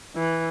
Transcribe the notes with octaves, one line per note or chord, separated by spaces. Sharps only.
E3